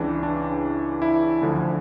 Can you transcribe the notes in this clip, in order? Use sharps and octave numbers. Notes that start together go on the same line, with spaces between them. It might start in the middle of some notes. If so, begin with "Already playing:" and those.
Already playing: C#2 C#3 E3 D4
D4
E4
D2 D3 F3